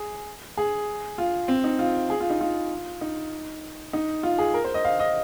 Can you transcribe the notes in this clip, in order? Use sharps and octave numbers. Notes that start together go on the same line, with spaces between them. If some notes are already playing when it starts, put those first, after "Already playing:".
Already playing: G#4
G#4
F4
C4
D#4
F4
G#4
F4
D#4
F4
D#4
D#4
F4
G#4
A#4
C5
D#5
F5
D#5